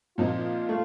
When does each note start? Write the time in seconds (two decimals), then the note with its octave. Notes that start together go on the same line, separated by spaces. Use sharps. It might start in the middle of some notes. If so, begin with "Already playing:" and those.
0.18 A#2 F3 C4 D#4 F4
0.69 A3